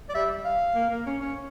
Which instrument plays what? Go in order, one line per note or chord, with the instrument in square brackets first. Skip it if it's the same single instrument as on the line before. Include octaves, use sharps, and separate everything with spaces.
[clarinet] D5
[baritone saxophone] G3 [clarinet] E5
[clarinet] F5
[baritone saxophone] A#3
A#3
C#4
C#4